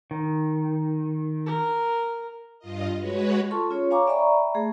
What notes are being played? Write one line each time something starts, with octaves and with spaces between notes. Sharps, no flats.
D#3
A#4
G2 F4 D#5
G#3 F#4 B4 C#5
F4 A4 A5 C6 C#6
C#4 F4 G#4 C#5
C#5 F5 G#5 A#5 C#6 D6
D5 E5 G5 A#5 B5 C#6
A3 G#4